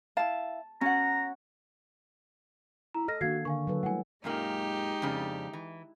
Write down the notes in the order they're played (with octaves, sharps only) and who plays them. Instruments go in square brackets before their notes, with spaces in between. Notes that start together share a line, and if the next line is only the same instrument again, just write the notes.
[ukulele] E4 F5 [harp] A5
[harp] C#4 F#5 [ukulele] F#4 [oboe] A#5
[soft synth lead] E4 [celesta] A#5
[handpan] A4 [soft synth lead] D#5 [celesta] F6 A#6
[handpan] D#3 A#3 D4 [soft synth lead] F#4 [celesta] F5 G#6 C7
[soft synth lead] D3 [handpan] A#4 [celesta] F5 G#5 C#6
[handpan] F#3 A4 B4
[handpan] G3 A3 E4 [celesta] F#5 G#5
[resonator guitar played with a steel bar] F#2 A#2 A#3 [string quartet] G#3 D#4 G4
[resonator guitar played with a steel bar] F2 C#3 D4
E3